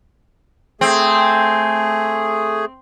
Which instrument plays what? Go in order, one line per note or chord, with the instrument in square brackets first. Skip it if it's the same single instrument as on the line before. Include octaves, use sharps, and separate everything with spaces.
[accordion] A3 G#4 [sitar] C4